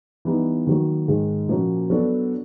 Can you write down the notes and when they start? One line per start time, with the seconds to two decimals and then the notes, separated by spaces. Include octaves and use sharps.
0.25 E3 G3 B3 D#4
0.67 D#3 F#3 A#3
1.08 G#2 D#3 G#3
1.48 A#2 F3 A#3 C#4 F#4
1.90 F#3 B3 D4 F#4 A4